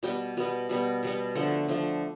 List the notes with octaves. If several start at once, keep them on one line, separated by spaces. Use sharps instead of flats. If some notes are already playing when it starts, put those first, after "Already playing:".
B2 G3 B3 G5
B2 G3 B3
B2 G3 B3
B2 G3 B3
D3 F3 A3 F#5
D3 F3 A3